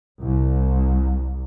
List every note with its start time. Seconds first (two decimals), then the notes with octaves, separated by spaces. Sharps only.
0.21 C2